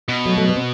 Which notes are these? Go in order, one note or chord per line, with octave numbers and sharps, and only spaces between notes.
B2
F#3 A3
F#3 A3
G3 B3
C4